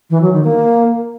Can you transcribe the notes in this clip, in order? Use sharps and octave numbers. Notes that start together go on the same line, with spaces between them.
E3
F#3
D#3
A#3